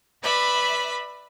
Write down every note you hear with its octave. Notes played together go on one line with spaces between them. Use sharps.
B4 D5 E5 B5